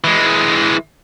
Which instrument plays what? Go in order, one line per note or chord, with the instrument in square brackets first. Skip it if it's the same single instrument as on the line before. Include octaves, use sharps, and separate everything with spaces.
[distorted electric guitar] E3 G#3